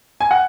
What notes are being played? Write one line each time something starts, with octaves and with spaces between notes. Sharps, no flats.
G#5
F#5